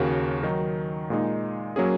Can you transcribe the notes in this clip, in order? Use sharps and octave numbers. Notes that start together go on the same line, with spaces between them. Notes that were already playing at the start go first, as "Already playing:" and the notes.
Already playing: D#2 C#3 A#3 F#4
D#3 F#3 D#4
A#2 G#3 D#4
F#3 A#3 C#4 G#4